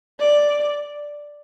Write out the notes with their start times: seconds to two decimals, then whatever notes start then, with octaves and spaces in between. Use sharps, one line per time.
0.20 D5